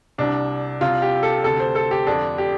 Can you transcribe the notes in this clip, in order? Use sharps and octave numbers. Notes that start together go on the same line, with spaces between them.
C2 C3 D4
C2 C3 F4
G4
A4
D2 C3 A4
C5
A4
G4
F2 D3 D4
G4